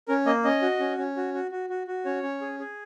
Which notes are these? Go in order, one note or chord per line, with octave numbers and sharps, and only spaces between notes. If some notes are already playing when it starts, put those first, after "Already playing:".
C#4 A#4
A#3 D#5
C#4 D#5
F#4
C#4
C#4
F#4
F#4
F#4
F#4
F#4
C#4 C#5
C#4
G#4
G#4